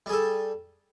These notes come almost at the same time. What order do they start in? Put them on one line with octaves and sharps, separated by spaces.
G3 G#4 A4